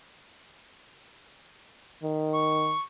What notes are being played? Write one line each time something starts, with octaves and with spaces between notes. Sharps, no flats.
D#3
C#6